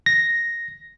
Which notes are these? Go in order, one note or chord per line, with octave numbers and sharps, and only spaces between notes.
A#6